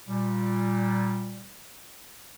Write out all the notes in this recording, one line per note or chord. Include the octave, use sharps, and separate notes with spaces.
A#2 G3